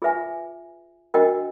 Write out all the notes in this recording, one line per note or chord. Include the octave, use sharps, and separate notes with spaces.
F4 G#4 B4 E5 G#5
D4 F#4 A#4 D#5 G5